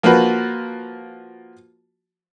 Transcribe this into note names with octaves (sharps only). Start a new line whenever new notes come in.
F3 A#3 F4 F#4 B4